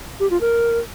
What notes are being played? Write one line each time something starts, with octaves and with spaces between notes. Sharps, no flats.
G4
F4
A#4